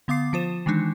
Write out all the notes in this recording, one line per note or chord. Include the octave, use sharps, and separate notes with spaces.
D3 B3 F5 D6 C7
F3 F4 C5 E7
D#3 E3 G#3 D4 D#4